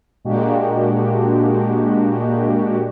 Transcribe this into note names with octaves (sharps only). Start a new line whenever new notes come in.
A#2 G#3 A#3 D4 F#4 G4